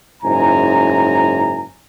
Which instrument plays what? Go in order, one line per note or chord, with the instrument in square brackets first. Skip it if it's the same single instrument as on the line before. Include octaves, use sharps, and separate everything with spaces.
[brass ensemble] F#1 G#2 C#4 E4 G#5 A#5